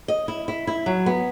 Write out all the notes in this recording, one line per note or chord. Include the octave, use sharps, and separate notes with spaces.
D#5
E4
E4
E4
F#3
B3